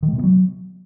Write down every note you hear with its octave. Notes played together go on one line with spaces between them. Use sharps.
D#3
G#3
C3
B3
F#3